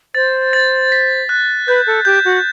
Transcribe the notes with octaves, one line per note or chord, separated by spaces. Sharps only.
C5 A6
A6
B6
F#6
B4 G6
A4
G4 G6
F#4